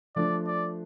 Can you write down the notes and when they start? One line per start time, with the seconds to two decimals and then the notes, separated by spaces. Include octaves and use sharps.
0.16 F3 A3 D4 D5
0.47 D5